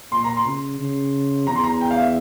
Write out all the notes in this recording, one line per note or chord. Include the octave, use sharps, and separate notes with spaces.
A#2 C6
A#5
C6
C#3
C#3
E2 A#5
C6
A#5
G5
F5
E5